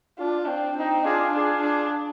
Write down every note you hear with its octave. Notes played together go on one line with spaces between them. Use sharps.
D4 F4
C4
C4 D#4
D4 F4 G#4
D4 F4 G#4
D4